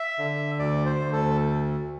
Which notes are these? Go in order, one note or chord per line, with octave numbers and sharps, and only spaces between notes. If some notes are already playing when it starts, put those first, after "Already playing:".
Already playing: E5
D3
D2 D5
C5
D2
A4